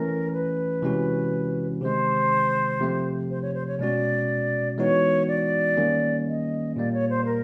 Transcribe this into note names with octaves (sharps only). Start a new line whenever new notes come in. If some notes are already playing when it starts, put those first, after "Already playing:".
Already playing: E3 A3 C#4 A#4
B4
C3 E3 G#3 C#4 F#4
C3 D#3 G#3 C5
C3 F3 A3 C4
C5
C#5
C5
C#5
B2 G#3 C#4 F#4 D5
E3 G#3 B3 D#4 F#4 C#5
D5
D#3 G3 A#3 C#4
D#5
A#2 G3 A#3 D5
C#5
C5
A#4